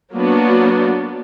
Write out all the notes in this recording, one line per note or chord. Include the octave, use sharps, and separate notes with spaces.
F#3 A#3 B3 D4 F#4